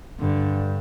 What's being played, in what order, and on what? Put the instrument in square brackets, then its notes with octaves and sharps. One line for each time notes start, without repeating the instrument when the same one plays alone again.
[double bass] G2 [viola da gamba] D3